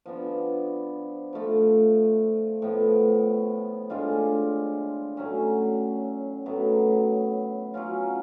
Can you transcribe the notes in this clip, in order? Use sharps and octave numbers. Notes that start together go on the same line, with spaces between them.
F3 B3 D4
F3 A3 F4
A2 F3 B3
A2 G#3 D4 F4
A2 F#3 C#4
A2 F#3 B3
F#3 C#4 F4